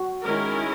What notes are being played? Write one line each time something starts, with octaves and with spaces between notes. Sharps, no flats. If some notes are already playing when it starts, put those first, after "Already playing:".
Already playing: F#4
D#3 G#3 C#4 E4 A#4